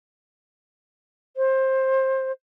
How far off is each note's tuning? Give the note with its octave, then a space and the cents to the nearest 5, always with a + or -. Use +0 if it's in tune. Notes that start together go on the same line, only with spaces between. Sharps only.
C5 +20